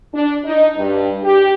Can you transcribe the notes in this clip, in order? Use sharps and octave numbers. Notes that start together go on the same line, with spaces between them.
D4
D#4
G2
G4